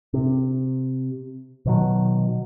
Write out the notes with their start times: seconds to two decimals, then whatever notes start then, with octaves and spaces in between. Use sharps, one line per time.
0.14 C3
1.66 B2 D#3 F#3